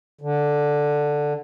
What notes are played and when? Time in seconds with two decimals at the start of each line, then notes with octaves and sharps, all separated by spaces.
0.21 D3